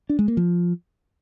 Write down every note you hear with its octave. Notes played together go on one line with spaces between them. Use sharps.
D4
G#3
A#3
F3